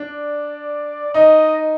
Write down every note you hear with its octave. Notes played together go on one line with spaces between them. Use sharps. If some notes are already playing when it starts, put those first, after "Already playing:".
Already playing: D4 D5
D#4 D#5